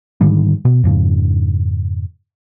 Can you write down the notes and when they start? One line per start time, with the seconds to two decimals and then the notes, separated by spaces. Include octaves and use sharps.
0.21 G#2 D3 D#3 G3
0.65 B2
0.84 F2 G#2 C#3